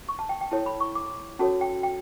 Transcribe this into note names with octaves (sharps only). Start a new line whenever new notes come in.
C#6
A5
G5
G5
E4 A4 C#5 A5
B5
C#6
D6
C#4 F#4 A4 C#5 A5
G5
G5